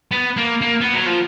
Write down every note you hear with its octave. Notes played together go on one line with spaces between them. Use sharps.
B3
A#3
A#3
B3
F#3
F3